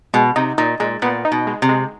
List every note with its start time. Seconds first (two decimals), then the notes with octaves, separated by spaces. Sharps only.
0.14 B2 G#3
0.36 C3 D#4
0.58 A#2 D#4
0.80 A#2 G#3
1.02 A#2 B3
1.25 D#4
1.32 B2
1.47 G#3
1.62 C3
1.69 G#3